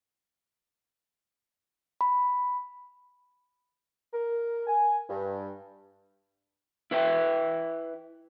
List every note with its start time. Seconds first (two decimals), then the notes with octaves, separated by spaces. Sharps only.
2.01 B5
4.12 A#4
4.67 G#5
5.09 G2
6.91 E4 B4 E5 G5